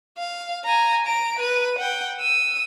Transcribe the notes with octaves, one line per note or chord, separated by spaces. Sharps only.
F5
G#5 A#5
A#5 D7
B4 D#7
F#5 G5
E6 D#7